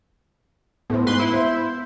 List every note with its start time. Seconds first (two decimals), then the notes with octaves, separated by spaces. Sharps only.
0.90 A2 B3 C5
1.07 G#2 B4 C6
1.20 E4
1.34 C5